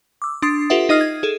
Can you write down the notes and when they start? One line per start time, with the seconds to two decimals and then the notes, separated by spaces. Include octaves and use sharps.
0.22 D6 E6
0.42 D4 C6 D#6 A6 C7
0.70 F4 G4 A4 B4 E5 F#5
0.89 D#4 D#5 D#6 F6 C7
1.01 G#6
1.23 G#4 A4